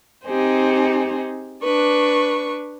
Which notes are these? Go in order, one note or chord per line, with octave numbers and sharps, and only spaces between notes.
C4 D#4 G4 G#4 C5
D4 B4 C#6